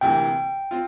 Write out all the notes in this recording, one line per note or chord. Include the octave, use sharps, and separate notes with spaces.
D2 C3 E3 A#3 G5
C4 F4